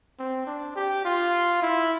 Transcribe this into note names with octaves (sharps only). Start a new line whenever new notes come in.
C4
D4
G4
F4
E4